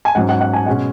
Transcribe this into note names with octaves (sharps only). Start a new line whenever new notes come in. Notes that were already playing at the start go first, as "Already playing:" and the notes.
G#5
G#2 F#3 C#4 F#5
F#5
F#5
G#5
B2 G#3 C#4 F#5